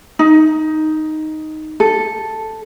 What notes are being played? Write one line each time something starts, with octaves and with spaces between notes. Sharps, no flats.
D#4
A4